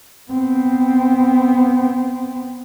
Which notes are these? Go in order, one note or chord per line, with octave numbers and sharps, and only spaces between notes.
B3 C4